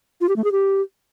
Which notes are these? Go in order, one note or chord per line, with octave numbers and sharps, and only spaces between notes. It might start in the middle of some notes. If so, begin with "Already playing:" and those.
F4
G4
A3
G#4
G4